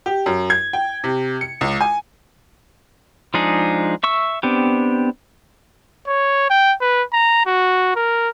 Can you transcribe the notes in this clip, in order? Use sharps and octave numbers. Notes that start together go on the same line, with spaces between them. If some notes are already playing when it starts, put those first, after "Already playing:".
G4
F#2
G#6
G5
C3
C#7
C#2
G#5
F3 G#3 D4 D#4 G#4
E5 C#6 E6
B3 C4 D4 G4
C#5
G5
B4
A#5
F#4
A#4